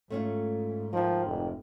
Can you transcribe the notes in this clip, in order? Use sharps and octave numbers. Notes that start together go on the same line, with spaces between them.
G#2 A3 C#4 F4
D2 D#3 F3
F1